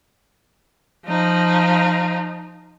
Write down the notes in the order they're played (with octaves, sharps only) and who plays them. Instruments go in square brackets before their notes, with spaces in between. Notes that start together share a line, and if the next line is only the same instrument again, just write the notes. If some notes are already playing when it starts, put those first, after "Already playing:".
[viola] F3 D#4